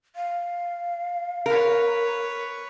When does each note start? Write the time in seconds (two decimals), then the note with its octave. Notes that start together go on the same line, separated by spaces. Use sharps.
0.16 F5
1.46 A#4 B4 C#5